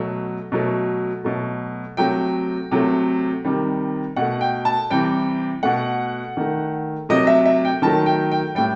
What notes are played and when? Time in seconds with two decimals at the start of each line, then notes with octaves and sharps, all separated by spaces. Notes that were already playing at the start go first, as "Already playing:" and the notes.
Already playing: B2 F#3 A3
0.52 B2 F#3 A3
1.24 B2 F#3 A3
1.97 C3 F#3 A3 G5
2.71 C3 F#3 A3
3.45 C3 D#3 G3
4.16 B2 A3 F#5
4.41 G5
4.65 A5
4.90 C3 E3 G3 G5
5.63 B2 A3 F#5
6.37 D#3 A3
7.09 C3 F#3 A3 D#5
7.27 E5
7.46 E5
7.65 G5
7.82 D#3 F#3 A3 A5
8.06 G5
8.32 G5
8.55 A2 G3 G5